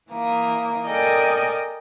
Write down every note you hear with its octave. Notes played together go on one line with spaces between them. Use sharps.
E3 A#3 D#6
A4 A#4 D5 D#5 G5 G#5